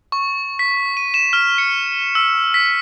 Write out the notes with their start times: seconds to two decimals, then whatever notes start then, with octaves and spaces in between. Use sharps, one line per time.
0.12 C#6
0.59 B6
0.97 D#7
1.14 E7
1.33 F6
1.58 C#7
2.15 E6
2.54 B6